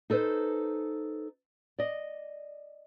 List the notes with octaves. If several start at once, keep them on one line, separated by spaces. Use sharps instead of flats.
D#4 A4 B4 C5
D5 D#5